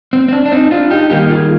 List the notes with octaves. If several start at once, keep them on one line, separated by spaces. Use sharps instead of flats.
C4
C4
D4
D4
C4 D#4
D4 F4
D#4 G4
D#3 G3 A#3 D#4 G4
F4 G#4